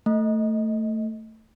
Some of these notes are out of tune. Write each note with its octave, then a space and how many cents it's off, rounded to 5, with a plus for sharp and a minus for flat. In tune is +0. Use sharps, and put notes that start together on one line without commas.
A3 +10 D#5 +10